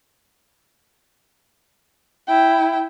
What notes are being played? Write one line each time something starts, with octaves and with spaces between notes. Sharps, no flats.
E4 G5